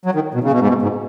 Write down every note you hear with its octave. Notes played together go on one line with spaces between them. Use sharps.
F#3
D#3
B2
C#3
B2
G#2
B2
G#2